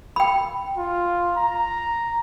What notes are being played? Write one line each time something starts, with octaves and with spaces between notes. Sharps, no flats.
G5 B5
F4
A#5